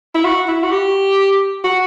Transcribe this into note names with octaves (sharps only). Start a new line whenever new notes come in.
E4
F#4
E4
F#4
G4
F#4